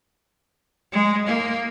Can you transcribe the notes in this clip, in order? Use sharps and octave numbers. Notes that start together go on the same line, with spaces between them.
G#3
A#3